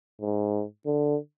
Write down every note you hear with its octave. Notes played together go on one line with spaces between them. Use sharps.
G#2
D3